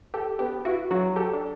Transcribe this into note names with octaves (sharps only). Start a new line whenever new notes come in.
G4 A4
B3 G4
E4 F#4
F#3 F#4
G4 A4
D4